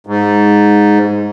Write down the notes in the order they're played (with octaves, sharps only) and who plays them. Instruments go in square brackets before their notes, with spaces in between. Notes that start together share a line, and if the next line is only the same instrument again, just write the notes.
[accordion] G#2